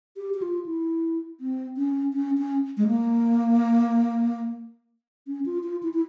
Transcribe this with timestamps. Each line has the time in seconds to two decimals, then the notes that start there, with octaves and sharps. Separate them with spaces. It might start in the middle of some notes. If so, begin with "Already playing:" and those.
0.17 G4
0.34 G4
0.42 F4
0.66 E4
1.40 C4
1.77 C#4
2.14 C#4
2.38 C#4
2.77 G#3
2.87 A#3
5.27 C#4
5.46 F4
5.63 F4
5.83 E4
5.93 E4